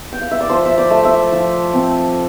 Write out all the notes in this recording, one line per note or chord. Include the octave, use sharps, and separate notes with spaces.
G5
F5
E5
D5
F3 C5
E5
D5
A3
E5
F3
C4